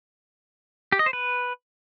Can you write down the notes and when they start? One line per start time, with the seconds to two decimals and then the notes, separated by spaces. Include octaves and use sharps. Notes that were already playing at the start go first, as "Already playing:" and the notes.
0.92 G4
0.99 D#5
1.06 C5
1.13 B4